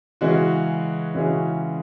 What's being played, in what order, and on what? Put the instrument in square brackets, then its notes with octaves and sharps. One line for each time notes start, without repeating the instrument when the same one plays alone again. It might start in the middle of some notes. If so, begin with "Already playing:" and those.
[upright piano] C#3 E3 G#3 C#4 F#4
C#3 E3 G#3 C#4 F#4